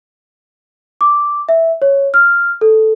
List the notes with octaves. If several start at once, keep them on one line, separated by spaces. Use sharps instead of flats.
D6
E5
C#5
F6
A4